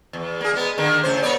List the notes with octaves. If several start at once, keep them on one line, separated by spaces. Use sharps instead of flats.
E2
A#3 G#4
G#3 B3
D3 D#3 A#3
A2 C#3 C5
A#3 C#5 D5